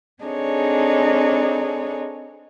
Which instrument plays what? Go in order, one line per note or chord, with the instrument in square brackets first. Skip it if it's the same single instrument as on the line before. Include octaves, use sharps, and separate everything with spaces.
[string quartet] C4 D4 D#4 G#4 A4 C#5